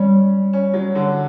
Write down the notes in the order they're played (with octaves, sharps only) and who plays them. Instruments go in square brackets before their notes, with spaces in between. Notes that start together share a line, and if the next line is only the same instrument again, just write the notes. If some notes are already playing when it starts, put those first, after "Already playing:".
Already playing: [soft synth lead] G3 [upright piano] C#4
[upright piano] C#4
F#3
D3